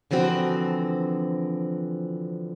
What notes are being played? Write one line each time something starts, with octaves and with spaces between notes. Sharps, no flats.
D3 E3 F3 C4 F#4